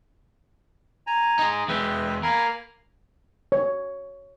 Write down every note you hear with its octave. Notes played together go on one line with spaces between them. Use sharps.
G#5 A#5
D#4 G#4
E2 G#3 B4 E5 G5
A#3 A#4 F5 G#5 B5
C#5